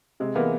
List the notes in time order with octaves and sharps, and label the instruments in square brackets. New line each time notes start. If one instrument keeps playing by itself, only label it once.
[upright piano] C3 [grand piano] G#3
[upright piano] E3 G#3 B3 [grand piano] A#3